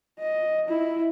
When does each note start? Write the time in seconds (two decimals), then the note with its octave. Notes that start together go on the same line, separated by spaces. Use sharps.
0.20 D#5
0.68 E4